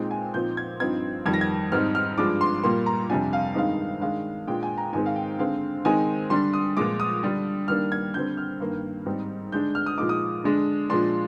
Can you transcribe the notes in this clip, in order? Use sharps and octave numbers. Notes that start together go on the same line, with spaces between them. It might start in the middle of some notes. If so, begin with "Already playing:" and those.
Already playing: A#2 G#3 C4 D#4 G5
G#5
A#2 F3 C4 D#4 G6
G#6
G2 F3 C4 D#4 G#6
F2 D#3 G3 G#6
A#6
G#6
G#2 G3 C4 D#4 F6
F6
G2 F3 G#3 D4 D6
C6
A#2 G3 A#3 C6
A#5
F2 C3 G3 D4 G#5
F5
G2 D#3 G#3 C4 D#4 F5
D#3 G#3 D4 F5
A#2 G#3 D4 G5
G#5
A#5
G#2 D#3 G#3 C4 G#5
F5
G5
D3 G#3 C4 F5
D#3 G#3 C4 D#4 G#5
D3 G3 D4 C6
D#6
A#2 F3 G#3 D6
D#6
D3 G3 D4
D#3 G3 A#3 D4 F6
G#6
D3 G3 C4 G6
F6
G2 D#3 A#3
G#2 G3 C4 D#4
D3 G#3 D4 G6
F6
D#6
A#2 F3 G#3 D#4 D6
D#6
D3 G#3 D4
A#2 F3 G#3 D4 C6